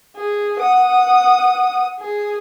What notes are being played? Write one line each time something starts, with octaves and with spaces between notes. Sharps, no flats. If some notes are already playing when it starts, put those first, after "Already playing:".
G#4
F#5 D#6
G#4